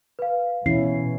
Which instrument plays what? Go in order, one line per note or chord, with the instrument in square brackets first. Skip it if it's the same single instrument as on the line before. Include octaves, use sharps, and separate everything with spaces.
[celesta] B4 F5
[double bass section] B2 [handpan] E3 C#4 E4 [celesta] C7